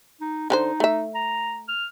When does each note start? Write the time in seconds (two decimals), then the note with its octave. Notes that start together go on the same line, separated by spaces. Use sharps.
0.21 D#4
0.50 D3 C#4 D#4 C5
0.80 A3 E5
1.15 A#5
1.68 F6